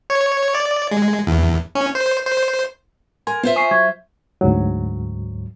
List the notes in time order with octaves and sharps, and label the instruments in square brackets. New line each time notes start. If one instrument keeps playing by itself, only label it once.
[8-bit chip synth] C#5
D5
G#3
E2
C#4
C5
C5
[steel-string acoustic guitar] A#4 [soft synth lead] G#5 [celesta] C6
[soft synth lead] B3 [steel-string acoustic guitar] F4 C5 E5
[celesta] G#5 C#6 C7 [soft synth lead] D#6
[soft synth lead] F#3 [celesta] C#6 G#6
[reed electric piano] D2 G#2 F#3